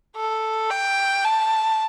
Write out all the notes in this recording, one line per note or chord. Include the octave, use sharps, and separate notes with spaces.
A4
G5
A5